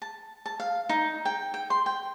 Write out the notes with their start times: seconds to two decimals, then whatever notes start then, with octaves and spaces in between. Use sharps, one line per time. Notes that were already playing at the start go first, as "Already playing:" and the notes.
0.02 A5
0.46 A5
0.60 F5
0.89 D#4
1.25 G5
1.54 G5
1.70 C6
1.86 G5